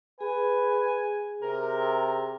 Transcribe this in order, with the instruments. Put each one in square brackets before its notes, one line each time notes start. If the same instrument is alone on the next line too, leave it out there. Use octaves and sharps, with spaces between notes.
[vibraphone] G#4 [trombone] B4 [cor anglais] G#5
[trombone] C3 [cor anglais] A#4